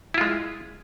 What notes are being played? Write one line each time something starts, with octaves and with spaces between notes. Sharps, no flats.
G#3 E4 F4